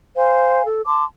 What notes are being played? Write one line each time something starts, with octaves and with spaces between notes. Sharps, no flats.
C5 F5 G#5
A4
A5 C6 D6